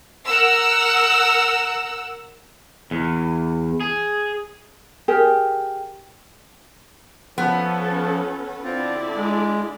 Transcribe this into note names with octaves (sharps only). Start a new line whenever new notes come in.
A#4 F#5 E6
E2
G#4
G4 G#4 A#4
F3 B3 C#4 A4
D3 C4 E4 F4 D5
G#3